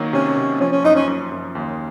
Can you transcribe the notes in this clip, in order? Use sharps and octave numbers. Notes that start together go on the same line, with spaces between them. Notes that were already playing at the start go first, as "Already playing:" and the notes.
Already playing: D#3 F#3 A#3
C3 C#4
C3
F3 C#4
C#4
F#2 D#4
C#4
F#2
F#2
D#2